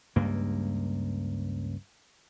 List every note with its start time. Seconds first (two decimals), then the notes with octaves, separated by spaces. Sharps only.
0.16 C#2 G2 A#3